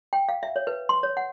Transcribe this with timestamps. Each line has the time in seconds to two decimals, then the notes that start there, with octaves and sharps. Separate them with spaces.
0.13 G5
0.29 F5
0.43 E5
0.56 C#5
0.67 B4
0.89 C6
1.03 C#5
1.17 F#5